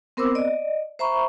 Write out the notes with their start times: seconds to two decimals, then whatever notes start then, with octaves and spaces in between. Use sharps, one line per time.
0.17 B3 C4 A#4 C5 D6 E6
0.35 D5 D#5
0.99 C5 E5 A#5 B5 C#6